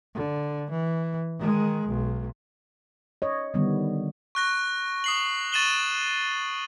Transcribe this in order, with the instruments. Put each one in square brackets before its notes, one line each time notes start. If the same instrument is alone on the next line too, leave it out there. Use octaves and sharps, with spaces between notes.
[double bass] D3
E3
D#3 G#3
B1
[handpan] C#5 D#5
D3 D#3 G3 B3
[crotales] C#6 F#6 A#6
D#6 C7 F#7
C#6 A6 D#7 E7 F#7 G7